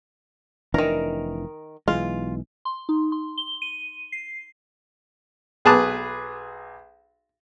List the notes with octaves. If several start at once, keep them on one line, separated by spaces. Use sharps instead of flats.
F1 D#3 E3 D4 A#4
B1 E3 G#3 F4
C6
D#4
C6
G7
D#7
C7
B1 G#4 B4 A5 D6 F#6